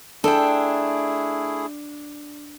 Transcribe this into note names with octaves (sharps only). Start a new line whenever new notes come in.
A3 D4 E4 G#4 A4 G5